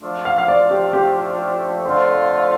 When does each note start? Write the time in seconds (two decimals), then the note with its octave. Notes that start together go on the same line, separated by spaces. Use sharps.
0.02 D3 F3 A3 D4 F4
0.25 F5
0.38 F5
0.48 D5
0.70 G4
0.93 G4
1.85 F2 D3 A3 F4 C5
2.15 F5